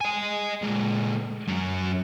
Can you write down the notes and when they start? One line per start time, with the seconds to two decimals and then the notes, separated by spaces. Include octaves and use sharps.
0.01 D#5 G#5
0.62 A#2 G#3
1.48 F#2 F#3